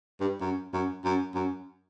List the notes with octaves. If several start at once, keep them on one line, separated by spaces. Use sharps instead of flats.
G2
F#2
F#2
F#2
F#2